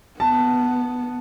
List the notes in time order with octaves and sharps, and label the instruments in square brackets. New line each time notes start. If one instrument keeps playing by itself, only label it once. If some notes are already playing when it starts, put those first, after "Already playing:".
[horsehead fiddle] B3 [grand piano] A5